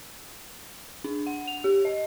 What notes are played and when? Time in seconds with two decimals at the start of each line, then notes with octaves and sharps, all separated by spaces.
1.04 D4
1.27 F#5
1.47 F7
1.64 G4
1.85 D#5